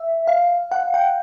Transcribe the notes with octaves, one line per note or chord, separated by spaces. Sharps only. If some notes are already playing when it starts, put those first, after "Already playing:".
Already playing: E5
F5
F#5
G5